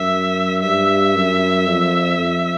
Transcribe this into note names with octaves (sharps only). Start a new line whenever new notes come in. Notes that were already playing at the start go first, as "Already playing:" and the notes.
Already playing: F#2 E5
G2 E5
F#2
F2
F2